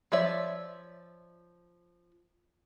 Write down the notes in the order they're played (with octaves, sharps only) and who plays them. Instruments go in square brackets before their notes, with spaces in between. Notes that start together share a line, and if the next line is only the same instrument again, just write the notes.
[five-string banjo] F3 C#5 D5 E5